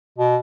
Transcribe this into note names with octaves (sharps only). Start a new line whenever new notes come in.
B2